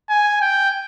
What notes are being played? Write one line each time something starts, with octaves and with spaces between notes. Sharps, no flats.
G#5
G5